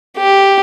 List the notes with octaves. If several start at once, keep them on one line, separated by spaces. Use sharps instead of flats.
G4